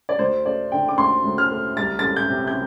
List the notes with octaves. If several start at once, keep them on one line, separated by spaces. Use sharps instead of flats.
D5
D2 C5
A3 D5
D3 G5
D6
D2 C6
D2
F6
A3
C2 A6
A3 A6
G6
C3
G6